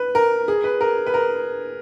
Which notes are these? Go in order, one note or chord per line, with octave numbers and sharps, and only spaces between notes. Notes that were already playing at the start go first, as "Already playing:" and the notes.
Already playing: B4
A#4
G#4
B4
A#4
B4
A#4